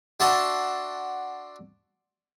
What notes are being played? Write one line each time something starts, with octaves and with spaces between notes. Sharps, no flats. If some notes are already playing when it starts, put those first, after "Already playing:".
D4 F#4 E5 F#5 A5 C6